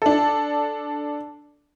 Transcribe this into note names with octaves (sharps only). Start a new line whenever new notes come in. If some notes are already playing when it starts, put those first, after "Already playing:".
D4 A4